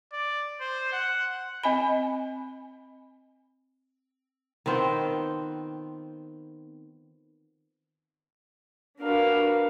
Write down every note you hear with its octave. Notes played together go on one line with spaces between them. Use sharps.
D5
C5
F#5
C4 D#5 G#5 B5
D#3 B3 C4 F4
D4 F#4 A#4 B4 F5